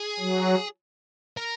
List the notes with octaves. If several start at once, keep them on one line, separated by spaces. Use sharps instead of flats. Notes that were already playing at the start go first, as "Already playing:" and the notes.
Already playing: G#4
F#3
A#4